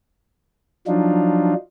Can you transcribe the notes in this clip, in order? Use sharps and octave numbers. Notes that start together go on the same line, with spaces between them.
F3 F#3 D4 D#4 F4